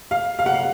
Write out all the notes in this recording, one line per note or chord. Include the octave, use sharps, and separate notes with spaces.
F5
F5
F#5
F5